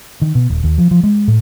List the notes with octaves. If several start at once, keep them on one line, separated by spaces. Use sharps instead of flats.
D#3
B2
D#1
D#2
F3
F3
G#3
A2